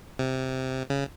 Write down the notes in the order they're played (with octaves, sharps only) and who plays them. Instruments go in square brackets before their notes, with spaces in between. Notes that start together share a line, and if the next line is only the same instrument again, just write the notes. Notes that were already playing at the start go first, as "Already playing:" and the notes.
[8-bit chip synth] C3
C#3